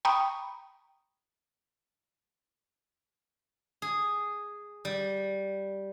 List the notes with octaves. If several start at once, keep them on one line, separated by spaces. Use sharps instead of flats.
G5 A#5 B5 C#6 D#6
G#4
G3